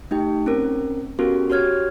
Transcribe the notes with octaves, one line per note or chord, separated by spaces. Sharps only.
A3 D#4 G4 G5
C4 C#4 A#4
B3 C#4 F#4 G4 A4 A#4
F#4 G4 C#5 F6 G#6